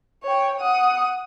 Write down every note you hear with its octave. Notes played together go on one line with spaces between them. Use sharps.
C#5 G5
F#5 D#6